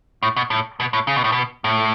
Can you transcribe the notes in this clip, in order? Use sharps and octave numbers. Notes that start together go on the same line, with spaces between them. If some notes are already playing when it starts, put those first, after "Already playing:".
A2
B2
A2
B2
A2
C#3
B2
A2
B2
A2